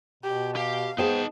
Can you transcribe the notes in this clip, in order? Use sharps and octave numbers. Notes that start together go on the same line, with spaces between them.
B2 G4
G4 F5
B3 D#4 G#4 C5 G5 A5